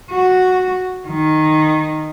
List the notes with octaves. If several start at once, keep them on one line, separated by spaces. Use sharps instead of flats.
F#4
D#3